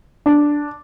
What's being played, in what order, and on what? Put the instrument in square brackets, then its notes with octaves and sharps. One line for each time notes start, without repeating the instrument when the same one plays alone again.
[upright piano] D4